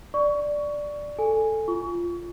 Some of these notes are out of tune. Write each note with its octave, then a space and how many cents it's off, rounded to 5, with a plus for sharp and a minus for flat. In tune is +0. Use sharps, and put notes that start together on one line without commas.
D5 +0 C#6 +20
A4 +0 G#5 -5
F4 -15 C#6 +35